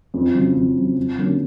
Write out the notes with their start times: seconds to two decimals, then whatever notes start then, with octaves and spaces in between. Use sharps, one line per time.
0.14 F2
0.35 C#3 F#3
0.56 F2
0.77 C#3 F#3
0.97 F2
1.18 D3 F#3 A#3 C#4